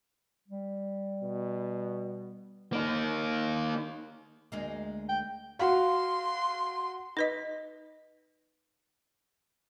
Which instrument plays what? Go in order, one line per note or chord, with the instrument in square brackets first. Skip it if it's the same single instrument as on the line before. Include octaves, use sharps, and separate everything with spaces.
[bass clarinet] G3
[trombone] B2
[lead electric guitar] A#3 D#4
[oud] D2 G#3 A#3
[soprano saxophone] G5
[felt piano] F#4 F5 [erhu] C6
[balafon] D#4 B4 D#5